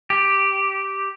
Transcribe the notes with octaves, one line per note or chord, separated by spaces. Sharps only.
G4